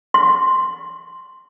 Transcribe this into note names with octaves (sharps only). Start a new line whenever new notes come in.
C6